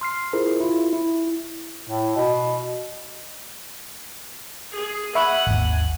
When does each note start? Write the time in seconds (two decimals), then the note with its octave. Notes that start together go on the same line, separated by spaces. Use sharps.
0.01 C6 F6 C7
0.33 E4 F4 G#4 A#4 C5
0.60 E4 F4
0.93 E4
1.88 A2
2.16 B2
4.72 G#4
5.15 E5 F#5 G#5 B5 C#6
5.47 G#1 D#2